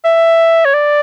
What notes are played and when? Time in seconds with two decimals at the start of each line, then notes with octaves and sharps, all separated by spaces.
0.05 E5
0.65 C#5
0.74 D5